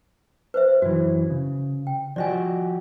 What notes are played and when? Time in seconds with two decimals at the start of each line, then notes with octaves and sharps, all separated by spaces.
0.54 B4 C5 E5
0.82 F#2 E3 F#4
1.30 C#3
1.87 G5
2.16 F3 F#4 G4 D5 D#5 G#5